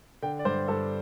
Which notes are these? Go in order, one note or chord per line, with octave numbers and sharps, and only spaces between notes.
D3 G5
D5
G2 C5
G2 A4